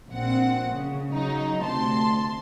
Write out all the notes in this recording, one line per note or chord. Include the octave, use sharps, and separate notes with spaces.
A#1 C4 F#5
C#3
C#3 F#3 D#4
D2 C3 A5 C6